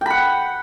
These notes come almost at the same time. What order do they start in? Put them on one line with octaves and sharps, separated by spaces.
G5 B5 F#5